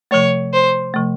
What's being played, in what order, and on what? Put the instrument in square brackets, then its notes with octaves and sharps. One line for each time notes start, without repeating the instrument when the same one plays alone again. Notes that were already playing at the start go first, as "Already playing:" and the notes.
[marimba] C3 F3 A3 [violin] C#5
[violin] C5
[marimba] C3 F3 A3